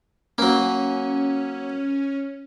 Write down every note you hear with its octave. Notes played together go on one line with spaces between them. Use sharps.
F#3 A#3 C#4